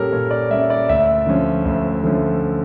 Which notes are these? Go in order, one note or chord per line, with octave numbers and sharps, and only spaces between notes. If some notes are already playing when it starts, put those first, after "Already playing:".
Already playing: A#2 G3 C#4 G4 A4 A#4 C#5
A#2 C#5
D5
G3 C#4 E5
D5
D2 E5
D3 F3 C#4
D2
D3 F3 C#4